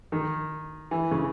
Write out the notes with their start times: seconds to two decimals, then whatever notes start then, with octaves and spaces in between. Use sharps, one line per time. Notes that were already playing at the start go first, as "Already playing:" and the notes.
0.12 D#3
0.91 E3
1.11 C#3